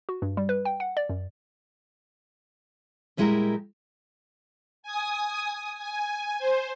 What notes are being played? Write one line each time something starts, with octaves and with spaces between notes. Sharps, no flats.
F#4
G2
G3
B4
G5
F#5
D5
F#2
A#2 G3 G#3 E4 G4 A#4
G#5 D#6
G#5
C5